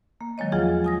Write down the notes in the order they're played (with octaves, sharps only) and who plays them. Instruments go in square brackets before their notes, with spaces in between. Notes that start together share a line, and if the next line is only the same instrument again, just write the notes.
[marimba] A#3
D#3 F#3 G#3 C#5 D#5
E2 F3 F4 G#4 F#5
G#5 D#6 A#6